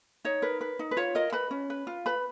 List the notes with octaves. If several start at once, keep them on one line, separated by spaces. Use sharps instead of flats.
D#4 C#5
A#4 B4
B4
D#4
B4
F4 C#5
A#4 D#5
B4 B5
C#4
B4
F4
B4 B5